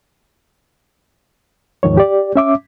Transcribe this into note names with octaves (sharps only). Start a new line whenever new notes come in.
D#2 G#2 D#3 F3 C#5
G4 D5
C#4 E5 D6